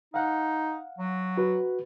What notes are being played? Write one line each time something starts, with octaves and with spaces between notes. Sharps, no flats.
D#4 F5 F#5
F#3
F#4 B4